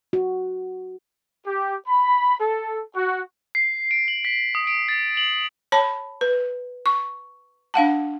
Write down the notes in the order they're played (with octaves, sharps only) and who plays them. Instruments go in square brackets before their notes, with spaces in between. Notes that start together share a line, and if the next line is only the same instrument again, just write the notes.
[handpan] F#4
[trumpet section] G4
B5
A4
F#4
[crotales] C7
D7
F#7
B6
D#6
D7
A6
F#7
[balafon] C#5 A5 B5
B4
C#6
D4 F5 F#5 A5